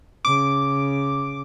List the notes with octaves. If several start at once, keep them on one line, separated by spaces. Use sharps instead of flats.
C#3 D6